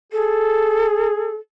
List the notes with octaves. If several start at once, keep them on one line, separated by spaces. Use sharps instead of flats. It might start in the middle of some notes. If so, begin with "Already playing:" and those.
G#4 A4